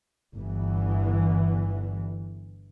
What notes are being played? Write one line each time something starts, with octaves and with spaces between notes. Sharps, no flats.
G1 E3